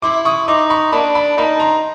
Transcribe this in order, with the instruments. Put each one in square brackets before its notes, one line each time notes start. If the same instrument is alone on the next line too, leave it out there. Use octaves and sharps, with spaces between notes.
[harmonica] E4 [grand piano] C6 D6
[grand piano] C#6 D#6
[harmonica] D#4 [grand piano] C6 D6
[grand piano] B5 C#6
[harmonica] A#3 D4 [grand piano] A5 B5
[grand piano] A5 B5
[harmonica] A#3 D#4 [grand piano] A5 B5
[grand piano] A#5 C6